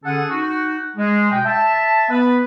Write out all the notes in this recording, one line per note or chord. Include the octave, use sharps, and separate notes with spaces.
D3 C#4 G#4 A4 F#5
D#4 F#4
G#3
B2 G5
E5 A5
B3 B4